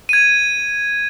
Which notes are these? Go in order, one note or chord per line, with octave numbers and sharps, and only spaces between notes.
G#6 D#7